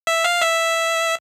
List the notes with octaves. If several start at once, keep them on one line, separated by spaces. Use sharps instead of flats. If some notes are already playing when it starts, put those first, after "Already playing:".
E5
F5
E5